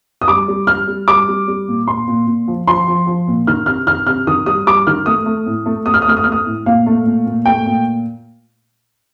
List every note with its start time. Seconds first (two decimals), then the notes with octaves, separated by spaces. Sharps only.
0.21 D#6
0.28 G3 D6
0.48 G3
0.67 G3 F6
0.87 G3
1.08 G3 D6
1.28 G3
1.48 G3
1.68 A#2
1.87 A#2 C6
2.08 A#2
2.27 A#2
2.48 F3
2.67 F3 C6
2.88 F3
3.07 F3
3.28 A#2
3.47 D#3 F6
3.66 C3 F6
3.87 D#3 F6
4.07 C3 F6
4.27 D#3 D#6
4.46 G3 D#6
4.67 G3 D6
4.87 D#3 F6
5.06 A3 D#6
5.26 A3
5.46 A2
5.66 A3
5.86 A3 D#6
5.94 F6
6.02 D#6
6.07 A3 F6
6.17 D#6
6.24 F6
6.27 A3
6.32 D#6
6.46 A2
6.66 A#2 F5
6.86 A3
7.06 A#2
7.26 A#2
7.45 A3 G5
7.66 A#2